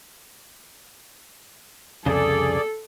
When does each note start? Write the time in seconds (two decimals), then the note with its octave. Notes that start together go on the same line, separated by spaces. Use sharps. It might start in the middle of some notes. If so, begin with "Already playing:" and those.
2.06 C2 F2 C#3 G#4 A4 D5